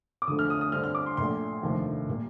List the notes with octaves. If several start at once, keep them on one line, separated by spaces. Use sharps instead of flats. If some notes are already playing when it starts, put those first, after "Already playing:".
D6
D2 D3 F3 A3 D#6
F6
D#6
D#6
G2 D3 G3 C4 F6
F6
D6
C6
A#1 A#2 A3 C6
F1 D#2 D3 F3 A3
A#2 G3 A#3